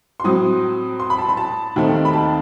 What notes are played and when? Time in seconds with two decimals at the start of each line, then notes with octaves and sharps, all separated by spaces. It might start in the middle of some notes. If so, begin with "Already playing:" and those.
0.20 C6
0.24 A2 F#3 C4 D#6
1.00 C6
1.10 B5
1.19 A5
1.29 B5
1.37 A5
1.76 D#2 D#3 A3 C4
2.05 B5
2.13 A5